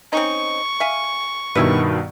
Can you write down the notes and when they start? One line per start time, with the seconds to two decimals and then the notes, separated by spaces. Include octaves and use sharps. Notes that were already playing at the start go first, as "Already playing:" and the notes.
0.13 C4 C#4 D#4 C#6
0.80 E5 F5 G#5
1.55 G2 B2 D#3 G3 E4 B4